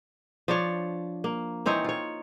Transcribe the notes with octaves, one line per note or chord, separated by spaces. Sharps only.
F3 D4 C#5
A#3
E3 C4 D#4 C#5
F4 C#5